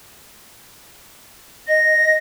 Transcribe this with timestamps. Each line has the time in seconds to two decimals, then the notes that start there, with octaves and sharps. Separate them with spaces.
1.68 D#5 A#6